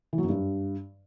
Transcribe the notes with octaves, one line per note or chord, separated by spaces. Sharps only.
E3
F#3
F#2
G2